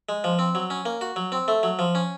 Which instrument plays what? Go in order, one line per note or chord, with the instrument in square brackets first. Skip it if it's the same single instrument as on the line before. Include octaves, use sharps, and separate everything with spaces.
[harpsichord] G#3
F3
C4
F#3
C#4
A#3
F#4
F#3
C4
A3
F#3
F3
C#4